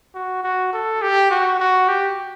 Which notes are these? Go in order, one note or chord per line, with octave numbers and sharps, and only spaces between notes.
F#4
F#4
A4
G4
F#4
F#4
G4